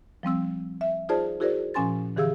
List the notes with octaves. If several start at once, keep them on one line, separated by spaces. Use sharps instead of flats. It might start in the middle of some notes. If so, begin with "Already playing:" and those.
F3 G3 C4 E6
E5
D#4 F4 G#4 C5 D5 A5
E4 F#4 G#4 A#4 C5 D5
A#2 F3 C#4 G#5 C6 A6
D3 E3 G4 G#4 F5 E6